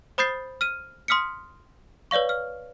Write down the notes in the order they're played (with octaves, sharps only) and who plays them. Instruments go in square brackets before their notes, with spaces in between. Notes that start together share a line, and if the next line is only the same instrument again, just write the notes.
[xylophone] C5 B5 D#6 G6 A6 C7
F6 D#7
C6 D#6 F6 B6 C#7
B4 C#5 D5 F5 C#6
F6